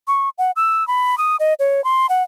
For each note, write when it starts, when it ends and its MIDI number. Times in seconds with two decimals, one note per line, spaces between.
0.07 0.29 85
0.38 0.51 78
0.56 0.86 88
0.87 1.18 83
1.18 1.36 87
1.40 1.53 75
1.59 1.83 73
1.84 2.06 84
2.09 2.23 78